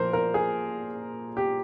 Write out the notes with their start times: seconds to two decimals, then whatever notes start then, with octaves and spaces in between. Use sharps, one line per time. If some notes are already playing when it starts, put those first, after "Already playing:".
Already playing: A#2 F3 A#3 A#4 C5
0.13 A#4
0.34 G#4
1.37 G4